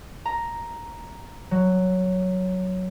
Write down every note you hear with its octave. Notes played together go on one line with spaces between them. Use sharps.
A#5
F#3